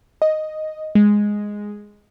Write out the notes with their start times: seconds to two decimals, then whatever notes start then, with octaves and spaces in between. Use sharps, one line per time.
0.22 D#5
0.95 G#3